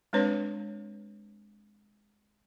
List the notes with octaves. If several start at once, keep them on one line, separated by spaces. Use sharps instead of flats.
G#3 C4 D4 B4 C#5